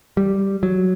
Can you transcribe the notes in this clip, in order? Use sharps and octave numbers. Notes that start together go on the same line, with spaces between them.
G3
F#3